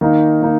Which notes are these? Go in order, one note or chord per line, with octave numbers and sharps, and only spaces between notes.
D#3 A#3 D#4
D#3 A#3 D#4